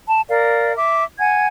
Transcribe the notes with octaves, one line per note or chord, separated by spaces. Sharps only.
A5
A#4 D5 F5
E5 D6
F#5 G#5 G#6